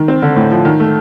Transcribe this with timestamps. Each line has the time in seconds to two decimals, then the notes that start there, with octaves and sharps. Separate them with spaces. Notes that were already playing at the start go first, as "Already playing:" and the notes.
Already playing: D#3
0.08 C4
0.22 D3
0.36 A2
0.51 F3
0.65 D#3
0.80 A3